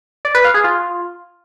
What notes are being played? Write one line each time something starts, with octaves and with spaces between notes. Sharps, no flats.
D5
B4
F5
G#4
F4